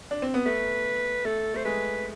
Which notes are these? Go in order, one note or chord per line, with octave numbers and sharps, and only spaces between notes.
D4
C4
B3
A3 B4
A3 A4
A3 C5
G#3 B4